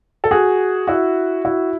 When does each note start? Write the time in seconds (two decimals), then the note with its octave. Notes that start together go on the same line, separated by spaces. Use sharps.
0.24 A4
0.31 F#4 G#4
0.87 E4 F#4
1.45 E4 F#4